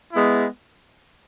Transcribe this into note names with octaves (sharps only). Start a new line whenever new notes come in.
G#3 B3 E4